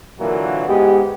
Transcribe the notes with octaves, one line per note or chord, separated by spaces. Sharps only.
A#2 D3 E3 F#3 A#3
G#2 G#3 B3 G4